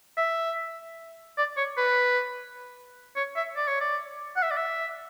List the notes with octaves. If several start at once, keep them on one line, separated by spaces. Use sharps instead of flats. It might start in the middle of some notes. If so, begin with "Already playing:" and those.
E5
D5
C#5
B4
C#5
E5
D5
C#5
D5
F#5
E5
D5
E5